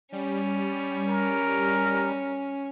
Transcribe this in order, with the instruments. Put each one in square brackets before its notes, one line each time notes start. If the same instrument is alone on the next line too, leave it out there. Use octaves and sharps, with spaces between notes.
[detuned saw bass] G3 [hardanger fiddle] C#4
[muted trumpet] A#4